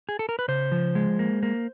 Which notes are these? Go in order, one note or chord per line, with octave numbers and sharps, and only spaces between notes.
G#4
A4
A#4
B4
C#3 C5
F3
G#3
A#3
A#3